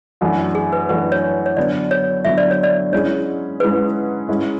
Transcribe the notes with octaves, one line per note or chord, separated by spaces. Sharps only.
F#2 E3 A3 D4 F#4
G#4
B4
F#2 E3 A3 D4 F#4 B4
C#5
C#5
D3 F#3 B3 D5
C#5
D3 F#3 B3 E5
D5
C#5
D5
G#2 G#3 C#4 E4 G#4 C#5
G#2 G#3 C#4 E4 G#4 B4
G#2 G#3 C#4 E4